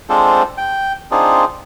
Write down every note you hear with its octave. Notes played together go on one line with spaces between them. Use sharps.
G#3 C4 D4 F4 A4 C5
G5
C4 D4 D#4 F4 G#4